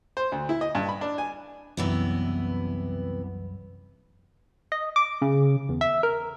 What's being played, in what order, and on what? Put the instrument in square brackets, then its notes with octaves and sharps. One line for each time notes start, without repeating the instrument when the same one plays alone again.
[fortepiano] C5
D2
E4
D#5
G2
B5
D4
G#5
[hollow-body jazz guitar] C2 F#2 [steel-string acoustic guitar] C3 E3 B3
[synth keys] D#5
D6
C#3
E2
E5
A#4